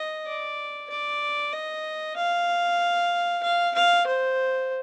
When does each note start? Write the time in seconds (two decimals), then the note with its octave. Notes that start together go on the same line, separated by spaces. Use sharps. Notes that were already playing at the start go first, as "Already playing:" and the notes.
Already playing: D#5
0.26 D5
0.90 D5
1.53 D#5
2.17 F5
3.43 F5
3.75 F5
4.07 C5